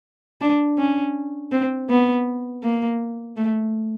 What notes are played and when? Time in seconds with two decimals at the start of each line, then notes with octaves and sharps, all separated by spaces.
0.41 D4
0.78 C#4
1.52 C4
1.90 B3
2.63 A#3
3.37 A3